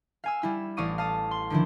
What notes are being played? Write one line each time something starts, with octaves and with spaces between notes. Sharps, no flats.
F5 G#5 E6
G3 E4 E6
A1 D5 F5 C#6 D#6 D#7
F5 A5 D#6
C6
D3 D#3 F3 D4 E4